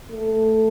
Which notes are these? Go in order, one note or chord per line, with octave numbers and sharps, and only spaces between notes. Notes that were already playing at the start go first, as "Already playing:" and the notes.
A3